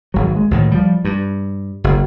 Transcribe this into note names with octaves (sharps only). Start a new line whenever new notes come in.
G#1 F#3
G#3
D2 A2 D#3
F3 G3
G2
F#1